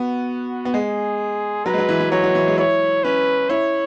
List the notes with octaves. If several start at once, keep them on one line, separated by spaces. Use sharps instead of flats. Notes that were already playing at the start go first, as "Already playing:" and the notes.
Already playing: B3 F#4
B3
G#3 G#4
F#3 B4
G#3
F#3
E3
E3
F#3 C#5
F#3
E3
G#3
E4 C#5
C#4 B4
E4 C#5